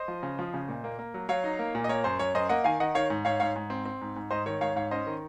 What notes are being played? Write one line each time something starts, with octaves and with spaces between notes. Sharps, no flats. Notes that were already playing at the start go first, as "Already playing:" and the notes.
Already playing: C5 D#5
F3
C#3
F3
C#3
A#2
A#3
A#3
F#3
F#3 C#5 F5
D#4
A#3
A#2
D#5
A#3 C#5
F#2 C5
F#2 C#5
F#2 C5 D#5
A#3 D#5 F#5
D#3 F5 G#5
D#3 D#5 F#5
D#3 C#5 F5
G#2
G#2 C#5 F5
G#2 C#5 F5
G#2
C4
C4
G#2
G#2
G#2 C5 D#5
D#3 C#5
G#2 C#5 F5
G#2 C#5 F5
C#4 C5 D#5
D#3